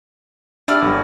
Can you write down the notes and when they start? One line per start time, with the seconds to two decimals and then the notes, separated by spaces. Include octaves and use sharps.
0.68 D4 E4 G4 D5 F6
0.82 G1 G3